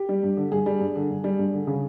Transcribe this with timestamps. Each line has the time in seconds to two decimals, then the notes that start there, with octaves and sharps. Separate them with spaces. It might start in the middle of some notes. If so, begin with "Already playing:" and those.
Already playing: G4
0.09 G3
0.23 G2
0.37 D3
0.52 G2 G#4
0.66 G3
0.80 G2
0.96 D3
1.10 G2
1.24 G3
1.39 G2
1.54 D3
1.67 C#3